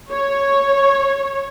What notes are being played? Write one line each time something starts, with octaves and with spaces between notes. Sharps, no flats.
C#5